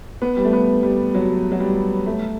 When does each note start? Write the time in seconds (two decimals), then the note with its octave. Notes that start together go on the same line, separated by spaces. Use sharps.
0.22 B3
0.37 G3
0.45 A3
0.53 B3
0.83 G3
1.14 F#3
1.52 F#3
1.60 G3
2.06 A3